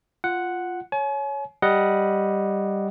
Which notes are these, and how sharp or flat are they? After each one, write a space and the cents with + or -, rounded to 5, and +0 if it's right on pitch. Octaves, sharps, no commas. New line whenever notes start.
F4 +0 F#5 +0
C#5 +0 G#5 +40
G3 +0 D#5 +0 F#5 +0